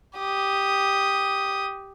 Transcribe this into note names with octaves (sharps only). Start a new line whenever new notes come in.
G4 D#6